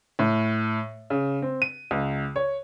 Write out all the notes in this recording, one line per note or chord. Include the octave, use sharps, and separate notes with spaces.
A2
C#3
C4
D#7
C#2
C#5